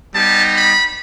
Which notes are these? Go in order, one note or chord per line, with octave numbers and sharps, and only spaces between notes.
G3 B3 D#4 G4 A5
B5